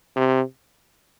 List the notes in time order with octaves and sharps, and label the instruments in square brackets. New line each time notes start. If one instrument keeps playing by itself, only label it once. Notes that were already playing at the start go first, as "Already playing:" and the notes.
[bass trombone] C3